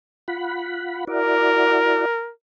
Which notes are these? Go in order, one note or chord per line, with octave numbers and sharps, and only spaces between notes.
F4 F#5 B5
E4 F#4 A#4 D5